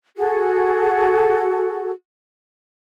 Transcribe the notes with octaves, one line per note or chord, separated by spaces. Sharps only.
F#4 G#4 A4